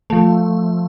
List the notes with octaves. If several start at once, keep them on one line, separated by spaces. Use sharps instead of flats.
F3 A3